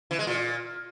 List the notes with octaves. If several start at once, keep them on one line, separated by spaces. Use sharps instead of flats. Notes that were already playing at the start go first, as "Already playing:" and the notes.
E3
G#3
A#2